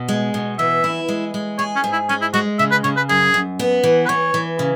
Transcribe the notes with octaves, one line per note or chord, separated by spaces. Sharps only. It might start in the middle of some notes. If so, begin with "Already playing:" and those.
Already playing: B2
G#3
B2
E3 E5
E4
G#3
G#3
G#4 C#5
C#4
G#2
E4
G#3 C#4
E4
G#3 F#4
C#3 E5
B4
C#3 C#5
B4
F#2 G#4
F#2
B3
E3
B4
E3 C#5
E3
C#3